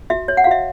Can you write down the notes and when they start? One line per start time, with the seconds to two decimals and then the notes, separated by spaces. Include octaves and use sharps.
0.10 F#4 E5
0.28 C#5
0.37 F#5
0.44 F5
0.47 F#4 E5